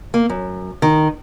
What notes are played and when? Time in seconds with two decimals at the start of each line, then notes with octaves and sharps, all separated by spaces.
0.14 A#3
0.30 F#2
0.82 D#3